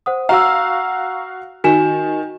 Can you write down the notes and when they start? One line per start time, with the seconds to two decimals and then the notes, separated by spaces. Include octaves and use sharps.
0.06 C5 F#5 D#6
0.29 F#4 F5 A#5 E6
1.64 D#3 F#4 G#5 E7